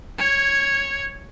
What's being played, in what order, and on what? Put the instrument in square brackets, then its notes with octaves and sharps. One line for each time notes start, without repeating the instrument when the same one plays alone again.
[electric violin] C#5 G#6